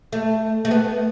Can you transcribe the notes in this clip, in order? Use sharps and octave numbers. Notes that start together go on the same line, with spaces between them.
A3
A3
B3